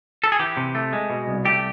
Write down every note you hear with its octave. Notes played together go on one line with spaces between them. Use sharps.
A4
G#4
E3 G4
C3
A3
G#3
B2
C2
A3 G4